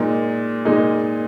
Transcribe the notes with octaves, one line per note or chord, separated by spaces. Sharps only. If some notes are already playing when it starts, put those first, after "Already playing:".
Already playing: A#2 G#3 D#4
A#2 G#3 D#4